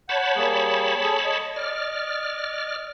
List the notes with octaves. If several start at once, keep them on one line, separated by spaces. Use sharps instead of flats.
C#5 F#5 A5 B5 G6
G3 A#3 G#4
G#4 A4
D#5
D5 F6